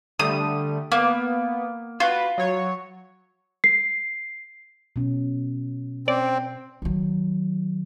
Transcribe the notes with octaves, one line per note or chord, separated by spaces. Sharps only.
D3 G3 A3 D#6
A#3 B3
F4 F#4 B4
F#3 C#5
C7
B2 C#4
C4 C#4 D5
D#3 F#3